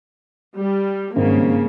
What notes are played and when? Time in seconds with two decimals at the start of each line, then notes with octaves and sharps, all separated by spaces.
0.57 G3
1.16 G#1 G2 C#3 A#3